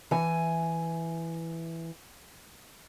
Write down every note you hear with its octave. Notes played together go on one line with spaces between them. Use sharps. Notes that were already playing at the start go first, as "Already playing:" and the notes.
E3 G#5